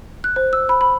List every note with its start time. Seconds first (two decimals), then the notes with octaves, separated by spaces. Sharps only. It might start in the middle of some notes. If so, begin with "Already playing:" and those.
0.24 F#6
0.36 C5
0.53 E6
0.69 B5
0.81 B5